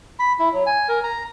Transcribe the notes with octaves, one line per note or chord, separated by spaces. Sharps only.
B5
E4
F#3
G#5
A#4
A#5